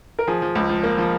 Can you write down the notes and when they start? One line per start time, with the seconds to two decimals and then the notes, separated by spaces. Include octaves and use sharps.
0.19 A#4
0.27 F3 G#4
0.42 F3
0.55 C#2
0.69 F3
0.83 A#3
0.98 F3